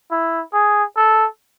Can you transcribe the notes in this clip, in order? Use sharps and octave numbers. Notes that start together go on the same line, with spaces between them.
E4
G#4
A4